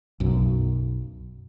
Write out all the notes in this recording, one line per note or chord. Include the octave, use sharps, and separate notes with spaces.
B1 F#2